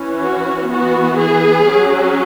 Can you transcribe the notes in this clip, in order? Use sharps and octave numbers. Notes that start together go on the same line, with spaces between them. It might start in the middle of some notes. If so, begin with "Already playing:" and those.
Already playing: E3 C#4
F#4
E3 B3 F#4
G#4
F#3 C#4